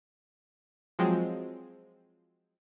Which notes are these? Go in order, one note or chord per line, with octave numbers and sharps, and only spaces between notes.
F3 F#3 G#3 C4